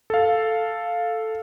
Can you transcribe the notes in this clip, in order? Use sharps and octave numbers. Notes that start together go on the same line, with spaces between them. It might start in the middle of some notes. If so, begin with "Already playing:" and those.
A4 F5